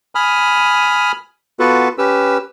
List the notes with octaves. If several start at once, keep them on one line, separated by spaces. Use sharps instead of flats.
G#5 B5 D#6 F6
B3 F4 F#4 A4 B4
C#4 G4 B4 E6